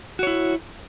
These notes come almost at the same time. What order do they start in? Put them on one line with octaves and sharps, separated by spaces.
F#4 C#5 E4